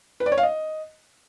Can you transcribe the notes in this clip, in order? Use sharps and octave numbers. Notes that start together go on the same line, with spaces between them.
B4
D5
C#5
F5
D#5